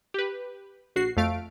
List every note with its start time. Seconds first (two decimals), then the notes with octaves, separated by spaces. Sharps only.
0.14 G4 B4
0.96 A#1 F#4 C7
1.17 F2 A3 F5 D7